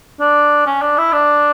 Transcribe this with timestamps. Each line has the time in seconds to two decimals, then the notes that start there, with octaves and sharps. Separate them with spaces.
0.20 D4
0.66 C#4
0.82 D4
0.98 E4
1.13 D4